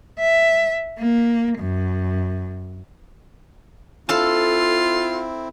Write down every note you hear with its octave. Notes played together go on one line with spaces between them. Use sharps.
E5
A#3
F#2
C4 E4 F4 A4 F5 A5